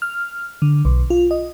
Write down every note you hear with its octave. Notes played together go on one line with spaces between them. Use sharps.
F6
D3
B1
F4
D#5